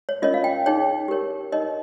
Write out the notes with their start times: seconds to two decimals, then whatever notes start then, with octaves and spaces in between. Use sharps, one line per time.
0.09 C#5
0.22 C#4 F4 A#4 C#5 D#5
0.34 F5
0.44 G5
0.66 D#4 G#4 C#5 G5
1.08 G4 A#4 C#5
1.52 D#4 A#4 C#5 D#5